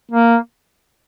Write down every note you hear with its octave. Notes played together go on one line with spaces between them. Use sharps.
A#3